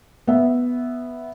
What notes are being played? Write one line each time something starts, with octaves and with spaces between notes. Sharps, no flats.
B3 E5